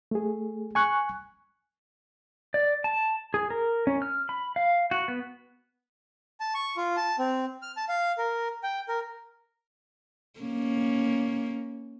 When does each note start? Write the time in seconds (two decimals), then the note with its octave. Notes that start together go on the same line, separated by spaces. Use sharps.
0.11 A3 G#4
0.75 G#5 C#6 F#6
2.54 D5
2.84 A5
3.34 G#4
3.50 A#4
3.87 C#4
4.02 F6
4.29 B5
4.56 F5
4.91 F#4
5.08 B3
6.40 A5
6.55 C#6
6.77 F4
6.97 A5
7.19 C4
7.62 F6
7.77 A5
7.89 F5
8.18 A#4
8.63 G5
8.89 A#4
10.40 A#3 C#4